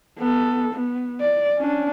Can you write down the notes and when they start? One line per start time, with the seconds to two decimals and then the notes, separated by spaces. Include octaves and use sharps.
0.18 B3 A4
0.74 B3
1.21 D5
1.58 C#4 D4